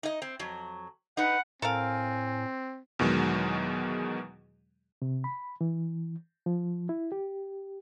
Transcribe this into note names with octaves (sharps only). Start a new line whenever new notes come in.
D#4 D#5
C4
F2 F#3
D#4 B4 F#5
A2 C4 A4 A#4 F5 G#5
E2 B2 D#3 F#3 G#3
C3
B5
E3
F3
E4
G4